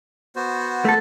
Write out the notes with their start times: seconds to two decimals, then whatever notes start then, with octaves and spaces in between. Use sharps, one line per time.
0.36 B3 F#4 C5
0.85 A3 A4